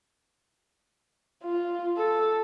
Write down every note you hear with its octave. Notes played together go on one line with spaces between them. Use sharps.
F4
A4